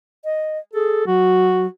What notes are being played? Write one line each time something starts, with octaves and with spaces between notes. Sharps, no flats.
D#5
G#4 A4
F#3 F#4